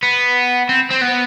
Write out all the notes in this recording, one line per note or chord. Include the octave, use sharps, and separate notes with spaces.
B3
C4
C4
B3